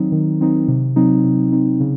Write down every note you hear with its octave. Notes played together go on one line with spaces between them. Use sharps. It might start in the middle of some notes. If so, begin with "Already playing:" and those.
Already playing: D#3 F#3 C4 D#4
D#3
F#3 C4 D#4
C3
F#3 C4 D#4
C3
F#3 C4 D#4
C#3